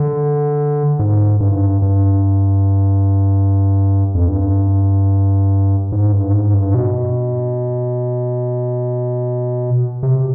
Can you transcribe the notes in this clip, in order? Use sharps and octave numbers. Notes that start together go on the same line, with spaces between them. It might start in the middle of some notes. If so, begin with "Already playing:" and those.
Already playing: D3
G#2
G2
G2
F2
G2
G#2
G2
G#2
G2
B2
C3